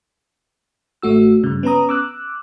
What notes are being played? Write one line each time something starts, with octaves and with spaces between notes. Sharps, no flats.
A1 A3 F#4 E6
G2 C#3
B3 C#4 B4 A#5 D#6
D6 E6 F#6